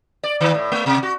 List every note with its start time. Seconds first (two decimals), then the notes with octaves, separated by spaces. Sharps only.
0.23 D5
0.41 D#3
0.54 A2
0.72 A3
0.86 C3
1.03 F#4